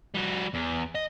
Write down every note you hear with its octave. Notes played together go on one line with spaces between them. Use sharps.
G3 F#4
E2
D#5